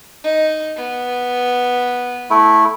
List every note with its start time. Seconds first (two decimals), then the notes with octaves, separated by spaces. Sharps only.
0.24 D#4
0.76 B3
2.30 A3 E4